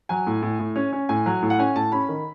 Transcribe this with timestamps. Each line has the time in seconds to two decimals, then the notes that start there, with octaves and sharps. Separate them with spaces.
0.09 F#3 G#5
0.27 A2
0.42 A2
0.59 A2
0.76 C#4
0.93 C#4
1.09 A2 G#5
1.26 F#3
1.42 A2
1.50 F#5
1.59 C#4 G#5
1.76 A2 A5
1.92 C#4 B5
2.08 D#3